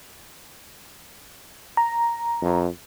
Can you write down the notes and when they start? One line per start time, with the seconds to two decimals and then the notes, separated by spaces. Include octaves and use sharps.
1.77 A#5
2.42 F2